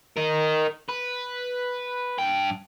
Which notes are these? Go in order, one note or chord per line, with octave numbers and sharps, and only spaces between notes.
A#4 D#5
B4
G2 G5